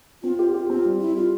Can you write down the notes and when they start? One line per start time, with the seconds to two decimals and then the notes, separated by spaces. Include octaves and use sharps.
0.23 C4 F4
0.38 F4 G4
0.54 F4 G4
0.70 C4 F4
0.85 G3
1.01 G3 E4
1.16 F4 G4